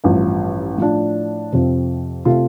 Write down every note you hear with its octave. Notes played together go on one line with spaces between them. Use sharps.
A1 G2 F3
A2 F3 D4
F2 C3 F3 C4
C3 A3 F4